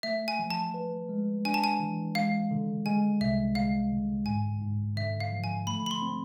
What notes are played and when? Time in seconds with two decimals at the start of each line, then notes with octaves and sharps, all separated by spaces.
0.03 A3 E5
0.28 G#5
0.39 F3
0.50 A5
0.74 B4
1.09 G#3
1.45 D4 G#5
1.54 A5
1.64 G#5
1.80 E3
2.15 G#3 F5
2.51 D3
2.86 G#3 G#5
3.21 C2 E5
3.55 G#3 F5
3.92 D3
4.26 G#2 G#5
4.61 G#2
4.96 D3 E5
5.20 F5
5.32 F3
5.44 G#5
5.67 A3 B5
5.86 B5
5.91 C6
6.02 C4